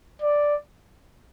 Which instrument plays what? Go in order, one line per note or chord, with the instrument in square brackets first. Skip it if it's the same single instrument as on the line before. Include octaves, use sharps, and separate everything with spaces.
[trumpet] D5